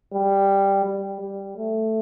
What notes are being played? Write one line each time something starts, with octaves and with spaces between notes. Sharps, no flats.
G3
G3
G3
A3